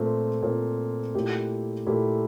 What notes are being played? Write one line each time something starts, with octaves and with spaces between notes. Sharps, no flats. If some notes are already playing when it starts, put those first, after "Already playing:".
Already playing: A#2 A3 C4
A#2 A3 C4
A#2 A3 E4 G4
A#2 A3 E4 G4